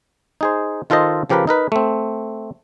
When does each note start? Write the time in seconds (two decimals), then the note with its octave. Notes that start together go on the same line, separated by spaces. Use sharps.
0.41 D#4 G#4 C5
0.90 D#3 F4 A4 C5 D#5
1.29 C#3 F3 G4 A#4 B4 G5
1.47 D#4 A#4 B4
1.72 A3 C4